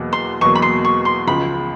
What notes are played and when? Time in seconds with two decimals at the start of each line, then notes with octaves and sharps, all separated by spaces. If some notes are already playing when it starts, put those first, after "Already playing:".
Already playing: E2 B2 F#3 A#3
0.13 C6
0.41 E2 B2 F#3 A#3 C#6
0.55 B5
0.62 C6
0.84 C#6
1.05 C6
1.27 C#2 C#3 F3 B5